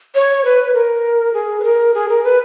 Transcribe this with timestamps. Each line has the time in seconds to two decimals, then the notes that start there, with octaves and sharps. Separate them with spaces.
0.15 C#5
0.45 B4
0.74 A#4
1.34 G#4
1.60 B4
1.64 A#4
1.94 G#4
2.09 A#4
2.24 B4